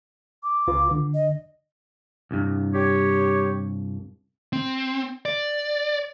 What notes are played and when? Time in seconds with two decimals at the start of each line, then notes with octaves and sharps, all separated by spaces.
0.43 D6
0.67 C#2 F4 B4
0.91 D3
1.14 D#5
2.31 C2 G2
2.74 G4 C#5
4.53 C4
5.25 D5